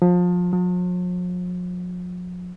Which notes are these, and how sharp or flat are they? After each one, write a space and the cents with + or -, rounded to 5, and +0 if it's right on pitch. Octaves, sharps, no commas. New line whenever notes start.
F3 +25
F3 +45